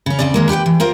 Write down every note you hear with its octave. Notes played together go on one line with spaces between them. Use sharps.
C#3 C#4
D2 A#2 C#3 C4 D5
D#2 G#3 A#3
G4 B4 F#5 G5
E3
A#3 F4 A#4 C5